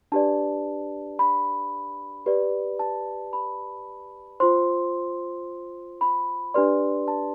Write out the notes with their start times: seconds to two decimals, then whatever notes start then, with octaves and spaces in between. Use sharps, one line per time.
0.12 D4 G4 B4 D5 A5
1.19 B5
2.26 G4 B4 D5
2.79 A5
3.33 B5
4.40 F4 C5 C6
6.01 B5
6.54 D4 G4 B4 D5 C6
7.08 A5